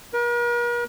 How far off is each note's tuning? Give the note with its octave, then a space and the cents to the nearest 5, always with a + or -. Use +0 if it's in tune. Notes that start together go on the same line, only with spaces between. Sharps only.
A#4 +45